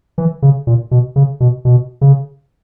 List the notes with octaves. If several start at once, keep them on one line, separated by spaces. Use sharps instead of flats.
E3
C#3
A#2
B2
C#3
B2
B2
C#3